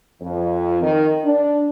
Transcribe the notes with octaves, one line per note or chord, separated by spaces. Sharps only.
F2
D#3
D4